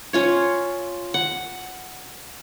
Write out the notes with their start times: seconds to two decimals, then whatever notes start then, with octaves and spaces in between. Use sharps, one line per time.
0.13 C#4 F4 C#5
1.14 F#5